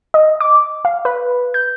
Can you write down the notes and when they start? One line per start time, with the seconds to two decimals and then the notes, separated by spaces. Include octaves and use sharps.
0.14 D#5
0.40 D6
0.85 F5
1.05 B4
1.54 G6